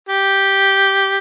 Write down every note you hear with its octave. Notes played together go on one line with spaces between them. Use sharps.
G4